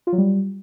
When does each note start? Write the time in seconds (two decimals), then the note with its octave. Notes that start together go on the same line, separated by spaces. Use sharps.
0.07 F4
0.13 F#3
0.18 G3